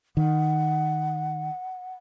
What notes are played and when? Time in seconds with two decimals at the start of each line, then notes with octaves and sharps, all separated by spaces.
0.17 D#3 F#5